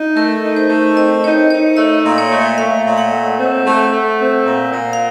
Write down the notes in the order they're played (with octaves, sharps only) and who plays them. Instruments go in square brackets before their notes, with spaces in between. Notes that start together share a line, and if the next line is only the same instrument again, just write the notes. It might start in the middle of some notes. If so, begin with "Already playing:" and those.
Already playing: [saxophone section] D#4
[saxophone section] A3 [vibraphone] A#4
[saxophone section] D#4
[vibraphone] C5
[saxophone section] A3
[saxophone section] C4 [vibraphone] D#5
[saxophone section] D#4 [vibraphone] C#5
[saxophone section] D#4 [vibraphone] C#5
[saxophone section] A3 [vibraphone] D#5
[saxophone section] A#2
[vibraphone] C#5
[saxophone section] A3
[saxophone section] A3 [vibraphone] F5
[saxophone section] A#2
[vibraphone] F#5
[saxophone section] A3
C4
A3
A3
C4
A#2
A#2
[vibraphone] F5